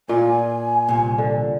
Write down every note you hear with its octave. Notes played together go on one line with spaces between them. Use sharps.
A#2 F4 G#5
C2 A#2
D3